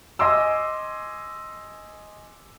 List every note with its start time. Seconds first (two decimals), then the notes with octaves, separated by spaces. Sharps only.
0.19 D#5 G#5 C6 D6 E6